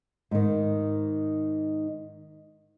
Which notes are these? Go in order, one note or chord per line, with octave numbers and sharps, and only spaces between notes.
G#2 D#3